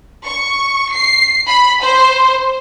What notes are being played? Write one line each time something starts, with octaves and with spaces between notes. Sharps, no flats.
C#6
C7
B5
C5